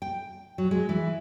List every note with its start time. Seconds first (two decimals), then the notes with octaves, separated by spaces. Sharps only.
0.02 G5
0.58 F#3
0.71 G#3
0.89 E3